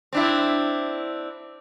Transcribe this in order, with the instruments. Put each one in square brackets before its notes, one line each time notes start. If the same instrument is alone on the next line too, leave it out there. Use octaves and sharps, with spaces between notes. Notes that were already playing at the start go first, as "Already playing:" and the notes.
[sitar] C4 D4 E4